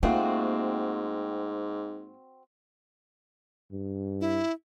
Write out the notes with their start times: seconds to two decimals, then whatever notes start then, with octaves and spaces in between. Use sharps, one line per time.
0.03 G#2 A3 A#3 C4 F4 F#4
3.72 G2
4.21 E4